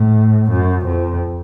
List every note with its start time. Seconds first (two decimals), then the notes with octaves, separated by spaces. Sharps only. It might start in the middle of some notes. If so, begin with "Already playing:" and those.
Already playing: A2
0.51 F#2
0.85 F2